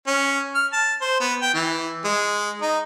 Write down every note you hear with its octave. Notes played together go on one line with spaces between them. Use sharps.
C#4
F6
A5
C5
B3
G5
E3
G#3
D#4